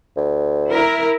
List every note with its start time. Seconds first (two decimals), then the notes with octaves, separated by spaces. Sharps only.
0.17 D2
0.71 E4 A#4